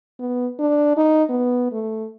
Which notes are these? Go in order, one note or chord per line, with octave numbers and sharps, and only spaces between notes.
B3
D4
D#4
B3
A3